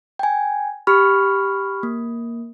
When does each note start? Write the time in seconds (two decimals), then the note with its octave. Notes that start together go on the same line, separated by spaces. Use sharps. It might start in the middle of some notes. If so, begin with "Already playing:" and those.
0.19 G5 G#5
0.87 G4 B5 C#6 F6
1.83 A#3